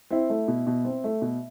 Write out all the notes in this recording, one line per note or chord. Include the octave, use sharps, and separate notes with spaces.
C4 E4
A3
B2
B2
C4
A3
B2